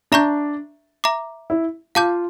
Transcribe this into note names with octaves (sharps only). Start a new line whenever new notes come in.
D4 E5 A#5 C#6 G6
E5 A#5 D6
E4
F4 F5 A5 D6 G6